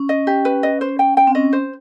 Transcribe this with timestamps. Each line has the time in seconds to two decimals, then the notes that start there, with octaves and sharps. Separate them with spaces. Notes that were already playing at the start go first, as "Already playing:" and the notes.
Already playing: C#4
0.09 D#5
0.27 G4
0.45 B4
0.63 D#5
0.81 C5
0.99 G5
1.17 G5
1.27 C4
1.35 C#4 D#5
1.53 C5